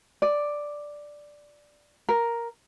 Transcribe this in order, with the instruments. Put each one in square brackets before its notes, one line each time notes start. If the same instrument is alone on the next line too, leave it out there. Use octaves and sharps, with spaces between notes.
[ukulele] D5
A#4